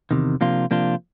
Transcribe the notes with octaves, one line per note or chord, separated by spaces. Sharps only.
E2 C3 D#3
C3 F3 A#3 D4 F4
C3 F3 A#3 D4 F4